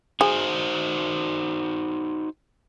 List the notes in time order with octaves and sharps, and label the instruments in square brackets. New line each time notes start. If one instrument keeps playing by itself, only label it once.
[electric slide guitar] D#4 F#4 C5 [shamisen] G#4